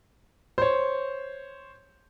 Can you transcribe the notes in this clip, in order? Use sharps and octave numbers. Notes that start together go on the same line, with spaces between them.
C5 C#5